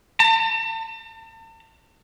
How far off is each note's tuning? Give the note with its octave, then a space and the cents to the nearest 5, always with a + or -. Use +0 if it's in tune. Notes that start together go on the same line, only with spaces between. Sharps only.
A5 +40